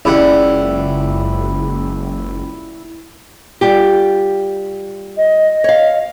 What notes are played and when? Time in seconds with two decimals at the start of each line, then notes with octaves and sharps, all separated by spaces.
0.05 F#1 C#2 E4 G4 D5 F#5
3.61 G3 F4 G4
5.17 D#5
5.64 C#5 F5